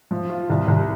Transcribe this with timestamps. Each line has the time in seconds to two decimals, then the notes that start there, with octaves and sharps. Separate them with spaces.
0.11 F3
0.29 F4
0.50 C2
0.68 C2